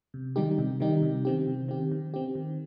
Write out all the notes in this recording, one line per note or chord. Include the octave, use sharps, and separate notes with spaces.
C3
D#3 G3 D#4 G4
C3
D#3 G3 D#4 G4
C3
D#3 C4 G4
C3
D#3 C4 G4
D#3
C4 G4
D#3